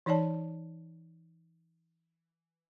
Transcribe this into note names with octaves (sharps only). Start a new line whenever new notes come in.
E3 D#4 C#5 D5 A5